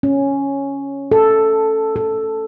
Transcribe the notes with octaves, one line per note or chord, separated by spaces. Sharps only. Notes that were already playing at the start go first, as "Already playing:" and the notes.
C#4
A4
A4